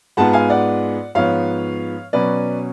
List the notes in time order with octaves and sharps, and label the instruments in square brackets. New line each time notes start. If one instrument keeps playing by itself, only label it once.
[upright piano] G#2 G#3 B3 F4 F#5 A5
F5 G#5
D5 F#5
G#2 F3 B3 C#5 F5
B2 F#3 C#4 B4 D5